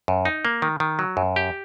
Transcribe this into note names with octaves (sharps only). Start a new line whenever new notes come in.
F#2
D#4
A#3
D#3
D#3
F#3
F#2
G4